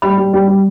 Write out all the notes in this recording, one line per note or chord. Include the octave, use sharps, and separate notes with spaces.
G3 B5
G3
G3
G3